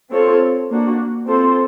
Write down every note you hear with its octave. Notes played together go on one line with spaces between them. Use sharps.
C4 F4 A4 C#5
A#3 D4 F#4
C4 F4 A4 C5